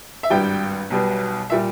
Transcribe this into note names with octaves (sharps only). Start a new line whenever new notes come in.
E5
G#1 G2 G3 G5
B1 B2 G3
A#2 G3 E5